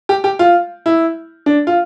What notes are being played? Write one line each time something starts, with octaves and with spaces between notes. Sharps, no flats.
G4
G4
F4
E4
D4
F4